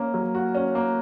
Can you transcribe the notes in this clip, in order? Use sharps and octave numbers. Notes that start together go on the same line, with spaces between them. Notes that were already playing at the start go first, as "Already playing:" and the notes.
Already playing: A#3 C#4
F#3
F#4
C#4
A#3